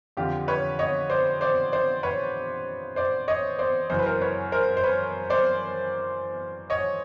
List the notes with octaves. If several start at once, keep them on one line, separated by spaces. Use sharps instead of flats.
F2 D3 F4 G4
B4 C#5
C#5 D#5
C5 D5
C5 D5
C5 D5
B4 C#5
C5 D5
C#5 D#5
C5 D5
F#2 C#3 E3 C5
B4
A#4 C5
B4 C#5
A#4 C5
C5
B4 C#5
C5 D5
C#5 D#5